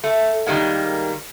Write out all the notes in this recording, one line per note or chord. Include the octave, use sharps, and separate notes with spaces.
A3
D#3 G3 G#3 A#3